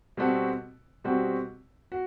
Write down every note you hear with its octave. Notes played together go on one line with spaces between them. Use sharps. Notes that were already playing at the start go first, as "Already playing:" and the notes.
B2 G3 C4 F#4 A4
B2 G3 C4 F#4 A4
F#4